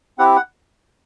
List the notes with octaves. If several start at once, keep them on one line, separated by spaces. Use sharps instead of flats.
C4 E4 G4 F#5
F#5